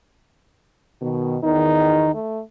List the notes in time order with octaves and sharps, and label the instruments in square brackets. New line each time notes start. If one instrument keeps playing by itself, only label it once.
[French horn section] B2 D#3
[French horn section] E2 D#3 [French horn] D#4
[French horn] A3